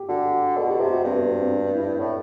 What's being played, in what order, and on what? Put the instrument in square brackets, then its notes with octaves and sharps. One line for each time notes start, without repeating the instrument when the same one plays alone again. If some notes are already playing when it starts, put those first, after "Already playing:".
Already playing: [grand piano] G4
[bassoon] D3 [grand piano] F#4
[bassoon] B2 [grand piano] A4
[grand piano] G4
[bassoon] C3 [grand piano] G4
[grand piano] F#4
[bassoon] G2 [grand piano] C4
[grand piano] B3
B3
C4
D4
E4
[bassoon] A2